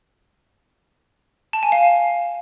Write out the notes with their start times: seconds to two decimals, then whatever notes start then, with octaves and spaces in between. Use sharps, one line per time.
1.53 A5
1.63 G#5
1.72 F5